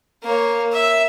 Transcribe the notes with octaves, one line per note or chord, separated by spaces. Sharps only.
A#3 C#5
E5